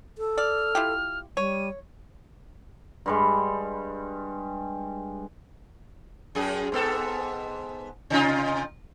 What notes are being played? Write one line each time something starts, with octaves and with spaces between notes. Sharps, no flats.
A4
D5 F6
E4 F4 G4
G3 C#5 D#7
G2 G3 G#3
F#2 G#4
G#2 B3 A4
C3 D#4 F4